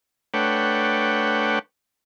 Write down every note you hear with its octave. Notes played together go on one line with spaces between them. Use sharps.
A3 D4 B4 C#5 F#5 G5